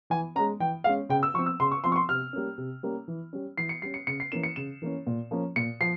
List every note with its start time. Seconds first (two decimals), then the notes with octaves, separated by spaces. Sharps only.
0.10 E3 G#5
0.36 C#4 A#5
0.39 G#3
0.60 E3 G5
0.84 G#3 C#4 F5
1.09 C#3 G5
1.23 E6
1.34 F3 C#6
1.38 C4
1.46 E6
1.60 C#3 C6
1.72 C#6
1.84 F3 C4 C6
1.92 C#6
1.96 C6
2.09 C3 F6
2.33 G3 A#3 C#4
2.58 C3
2.83 G3 A#3 C#4
3.08 E3
3.33 G3 C#4
3.58 E3 C7
3.69 C#7
3.82 G3 C#4 C7
3.94 C#7
4.07 C#3 C#7
4.20 C7
4.32 E3 A#3 C#4 E7
4.43 C#7
4.56 C#3 E7
4.82 E3 A#3 C#4
5.07 A#2
5.31 F3 A#3 C#4
5.56 A#2 C#7
5.81 F3 C7